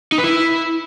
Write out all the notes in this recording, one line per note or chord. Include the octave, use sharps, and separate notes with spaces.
D#4
B4
E4